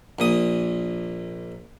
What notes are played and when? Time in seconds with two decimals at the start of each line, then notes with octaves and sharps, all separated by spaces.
0.19 A#1 A#2 D#6